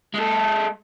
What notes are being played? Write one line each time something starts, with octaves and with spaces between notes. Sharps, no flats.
G#3 A4